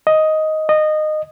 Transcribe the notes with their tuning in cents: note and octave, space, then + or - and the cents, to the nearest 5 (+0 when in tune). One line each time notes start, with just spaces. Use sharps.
D#5 +10
D#5 -15